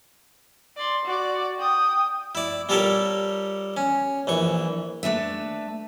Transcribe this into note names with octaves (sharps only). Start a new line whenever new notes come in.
D5 C6
F#4 D5
G5 D#6
E4 D5
G3 F4 G4 A4 A#4 C#5
C#4
A#1 E3 C#6
A3 D4 B4 E5